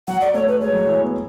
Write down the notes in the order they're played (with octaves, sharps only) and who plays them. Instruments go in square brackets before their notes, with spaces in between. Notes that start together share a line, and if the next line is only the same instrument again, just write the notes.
[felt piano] F#3 [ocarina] F#5
[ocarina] D5
[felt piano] A3 [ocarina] C#5
[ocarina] B4
[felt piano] G#3 [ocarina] C#5
[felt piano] F#3
E3
B3